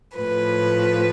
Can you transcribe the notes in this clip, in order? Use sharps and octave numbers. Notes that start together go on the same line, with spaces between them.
A2 F3 B4